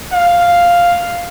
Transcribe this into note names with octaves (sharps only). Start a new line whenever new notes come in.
F5